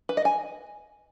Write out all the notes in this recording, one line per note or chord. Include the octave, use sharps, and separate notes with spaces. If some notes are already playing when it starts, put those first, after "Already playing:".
B4
D#5
G#5